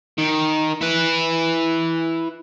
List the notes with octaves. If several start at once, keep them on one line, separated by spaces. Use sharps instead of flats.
D#3
E4 B4